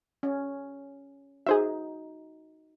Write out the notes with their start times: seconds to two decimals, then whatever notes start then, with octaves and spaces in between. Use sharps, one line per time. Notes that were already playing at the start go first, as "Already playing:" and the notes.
0.23 C#4
1.47 D#4 F#4 G#4 C5 E5